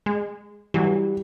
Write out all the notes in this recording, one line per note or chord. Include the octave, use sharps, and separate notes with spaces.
G#3
E3 F#3 G3